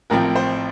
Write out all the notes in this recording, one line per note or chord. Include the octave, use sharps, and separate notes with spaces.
A1 A2 F3 C4 A#4
C5